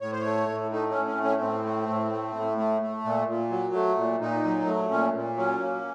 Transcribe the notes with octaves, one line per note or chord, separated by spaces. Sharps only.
A2 C#5
C5
A3 C#5
A2
A3 D#4
C#4
A2
C#4
A3
C#4
A2 C4
A3
A2
A3
A2
A3
A3
A#2
A#2
F#3
A3
A#2
A#2 D#4
F#3
A3
A#2 C#4
A#2
F#3 C#4
A#3